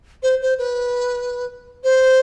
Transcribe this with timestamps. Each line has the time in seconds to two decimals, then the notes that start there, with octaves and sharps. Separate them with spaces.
0.23 C5
0.41 C5
0.58 B4
1.84 C5